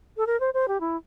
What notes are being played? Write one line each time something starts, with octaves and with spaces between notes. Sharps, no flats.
A4
A#4
C5
C5
G4
E4